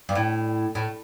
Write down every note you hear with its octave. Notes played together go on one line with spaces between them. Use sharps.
G2
A2
A2